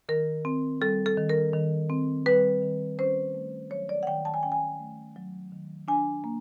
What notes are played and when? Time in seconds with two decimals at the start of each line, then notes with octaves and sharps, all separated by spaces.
0.09 D#3 A#4
0.45 C4
0.81 G3 A4
1.06 A4
1.17 D#3
1.29 A#4
1.53 D#3
1.89 C4
2.26 G3 B4
2.62 D#3
2.99 C#4 C5
3.34 A3
3.70 F#3 C#5
3.89 D5
4.03 F#5
4.07 D#3 G5
4.25 A5
4.34 G#5
4.43 C#4 G5
4.52 G#5
4.79 A3
5.16 F#3
5.52 D#3
5.88 D4 G#5
6.24 A#3